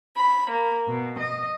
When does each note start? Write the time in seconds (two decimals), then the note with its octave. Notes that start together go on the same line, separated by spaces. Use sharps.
0.15 B5
0.49 A#3
0.87 B2
1.21 D#5